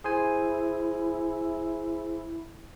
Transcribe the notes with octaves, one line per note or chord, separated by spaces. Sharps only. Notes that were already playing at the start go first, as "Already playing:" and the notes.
E4 G#4 C5 G#5